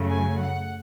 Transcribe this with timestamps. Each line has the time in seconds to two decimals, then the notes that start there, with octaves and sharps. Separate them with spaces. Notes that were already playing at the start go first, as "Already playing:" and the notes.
Already playing: F#2 C#3 F#3 A3
0.09 G#5
0.37 F#5